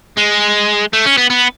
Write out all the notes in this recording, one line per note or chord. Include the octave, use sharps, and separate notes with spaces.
G#3
A3
C#4
B3
B3